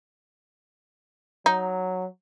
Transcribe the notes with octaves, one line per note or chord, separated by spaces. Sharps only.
F#3 D#4